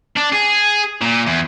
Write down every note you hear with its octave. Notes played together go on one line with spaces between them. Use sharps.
D4
G#4
A#2
E2